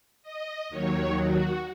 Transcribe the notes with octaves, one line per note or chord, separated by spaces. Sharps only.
D#5
D#2 D#3 F#3 C#5
F#4